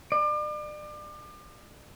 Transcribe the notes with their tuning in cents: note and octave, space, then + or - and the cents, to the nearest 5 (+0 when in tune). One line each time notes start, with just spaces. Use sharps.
D5 +35